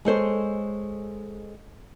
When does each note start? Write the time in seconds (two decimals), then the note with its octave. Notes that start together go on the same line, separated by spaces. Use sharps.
0.05 G#3 A4 C5 C#5